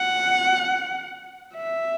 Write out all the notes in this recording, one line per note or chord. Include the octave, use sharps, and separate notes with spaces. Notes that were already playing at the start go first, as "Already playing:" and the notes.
Already playing: F#5
E5